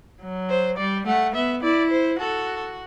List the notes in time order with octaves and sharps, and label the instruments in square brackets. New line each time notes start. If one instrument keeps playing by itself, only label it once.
[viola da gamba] F#3
[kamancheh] C5
[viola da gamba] G3 [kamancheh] D5
[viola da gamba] A3 [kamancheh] F#5
[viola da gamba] B3 [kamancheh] E5
[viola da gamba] E4 [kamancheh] D5
[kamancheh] C5
[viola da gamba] F#4 [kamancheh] A4